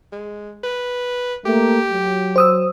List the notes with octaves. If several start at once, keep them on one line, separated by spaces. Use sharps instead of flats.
G#3
B4
A3 A#3 G4
F#3
C5 D#6 E6